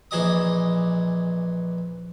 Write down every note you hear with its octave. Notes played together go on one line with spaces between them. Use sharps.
A#1 E3 G#4 D#5 D6 D#6